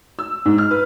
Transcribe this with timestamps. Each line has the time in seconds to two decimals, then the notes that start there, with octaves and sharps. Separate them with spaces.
0.19 E6
0.45 G#2
0.58 F6
0.71 B4